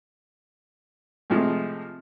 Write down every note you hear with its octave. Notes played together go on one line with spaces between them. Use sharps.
A2 C3 F3 G#3